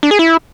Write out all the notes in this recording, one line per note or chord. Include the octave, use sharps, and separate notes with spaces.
D4
G#4
E4